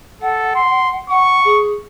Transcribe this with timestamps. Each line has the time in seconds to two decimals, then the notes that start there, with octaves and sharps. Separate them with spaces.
0.22 A4 F#5
0.55 C6
1.10 F#5 C#6
1.45 G#4